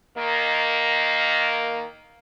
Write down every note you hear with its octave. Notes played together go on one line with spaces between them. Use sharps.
D#3 A#3